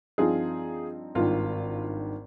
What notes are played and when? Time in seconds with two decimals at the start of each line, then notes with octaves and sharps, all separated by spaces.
0.18 G2 F3 C4 D#4 F4 G#4
1.15 G#1 G2 D#3 F4